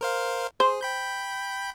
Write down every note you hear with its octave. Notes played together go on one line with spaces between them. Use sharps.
A#4 C5 F5
G#4 C5
G5 B5 G6